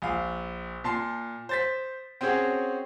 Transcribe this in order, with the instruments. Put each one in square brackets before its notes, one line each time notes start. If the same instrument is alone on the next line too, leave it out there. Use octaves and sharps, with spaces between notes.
[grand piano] A#1 F5
A#2 A5 C6 C7
C5 A6 B6
C4 C#4 F#4 G#4 C#5